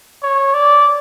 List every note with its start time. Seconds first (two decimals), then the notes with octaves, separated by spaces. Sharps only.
0.22 C#5
0.54 D5